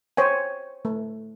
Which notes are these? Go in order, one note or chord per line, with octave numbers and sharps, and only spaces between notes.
C5 C#5 G5 G#5
A3